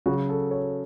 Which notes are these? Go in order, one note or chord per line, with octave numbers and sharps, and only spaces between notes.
C#3 F#3 F#4
A4
C#5